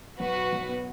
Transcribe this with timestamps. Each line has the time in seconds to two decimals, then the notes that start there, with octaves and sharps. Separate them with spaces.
0.20 B1 F#4 B4
0.35 B2
0.52 B1
0.69 B3